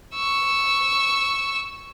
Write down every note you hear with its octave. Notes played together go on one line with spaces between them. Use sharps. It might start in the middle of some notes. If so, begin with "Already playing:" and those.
C#6 E6